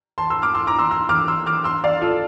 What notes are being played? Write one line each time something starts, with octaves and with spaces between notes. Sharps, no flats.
A5 C6
C6 E6
D6 F6
C6 E6
A#5 D6
C6 E6
C6 E6
D6 F6
C6 E6
D6 F6
C6 E6
D5 F5
F4 A4